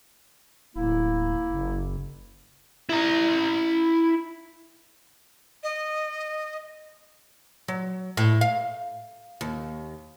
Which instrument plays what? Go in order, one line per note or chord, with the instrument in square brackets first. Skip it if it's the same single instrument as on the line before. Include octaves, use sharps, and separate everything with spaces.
[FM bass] D1 [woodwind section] A#3 E4
[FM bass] F#1
[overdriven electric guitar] E4 A#5
[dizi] D#5
[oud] F#3
A2
F5
D#2